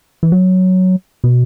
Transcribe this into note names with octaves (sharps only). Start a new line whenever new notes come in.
E3
F#3
B2